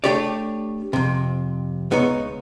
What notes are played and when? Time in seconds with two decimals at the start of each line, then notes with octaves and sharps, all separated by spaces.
0.04 A3 D4 G4 C#5 D5
0.93 F2 C3
1.91 C#2 B3 D#4 C#5